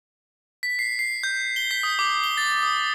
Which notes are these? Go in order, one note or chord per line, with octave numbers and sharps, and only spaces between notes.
B6
C7
C7
G6
G7
B6
D#6
D6
G7
A6
D#6